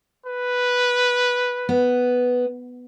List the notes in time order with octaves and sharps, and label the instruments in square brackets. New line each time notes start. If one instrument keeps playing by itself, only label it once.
[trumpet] B4
[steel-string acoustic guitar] B3